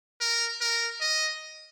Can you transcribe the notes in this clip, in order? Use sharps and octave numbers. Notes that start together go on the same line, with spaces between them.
A#4
A#4
D#5